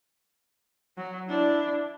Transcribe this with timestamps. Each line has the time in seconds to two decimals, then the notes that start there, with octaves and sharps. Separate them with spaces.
0.97 F#3
1.28 D4 E4